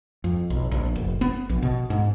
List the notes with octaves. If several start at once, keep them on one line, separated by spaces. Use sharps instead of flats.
F2
B1
A#1
F1
B3
A#1
B2
G#2